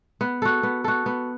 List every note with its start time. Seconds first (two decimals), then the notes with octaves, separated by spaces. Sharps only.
0.21 B3
0.42 F#4 A4
0.63 B3
0.84 F#4 A4
1.06 B3